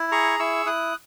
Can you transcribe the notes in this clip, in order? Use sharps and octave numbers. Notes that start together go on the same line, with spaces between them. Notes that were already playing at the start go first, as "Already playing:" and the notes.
Already playing: E4
G#4 A#5 C#6
E4 C#6 E6
E4 D#6 F#6